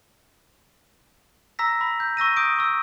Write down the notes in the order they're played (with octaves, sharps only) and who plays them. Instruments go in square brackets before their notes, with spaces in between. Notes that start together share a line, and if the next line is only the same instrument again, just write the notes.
[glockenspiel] A#5 E6 A#6 B6
B5
G6
C#6 E6 A#6 D#7
D#6 G6 D7
C#6 E6